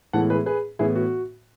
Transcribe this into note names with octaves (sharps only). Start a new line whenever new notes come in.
A2 E3 G#3 B3 F#5 A5
G#4 B4
G#4 B4
A2 E3 B3 E4 G#4
F#4